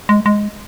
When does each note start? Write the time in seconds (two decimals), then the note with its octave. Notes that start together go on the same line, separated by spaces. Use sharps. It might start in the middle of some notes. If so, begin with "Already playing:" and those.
0.09 G#3
0.26 G#3